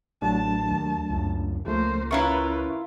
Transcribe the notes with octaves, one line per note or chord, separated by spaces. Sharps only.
A1 F#3 A3 D4 A5
D#2
C#2 F#2
C#2 F3 A3 A#3 C5
C#4 E4 F4 A#4 B4 E5 C#6